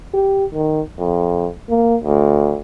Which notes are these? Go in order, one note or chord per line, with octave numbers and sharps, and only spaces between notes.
G4
D#3
F2
A#3
D2